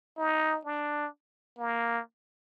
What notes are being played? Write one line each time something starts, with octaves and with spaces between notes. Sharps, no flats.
D#4
D4
A#3